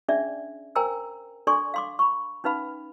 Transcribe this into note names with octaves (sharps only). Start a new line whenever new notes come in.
C#4 D4 G#4 D5 E5
A#4 C5 G5 G#5 A#5 E6
D4 A4 D5 G#5 C6 C#6
F5 C6 D6
B5 C#6
C#4 D#4 B4 F5 B5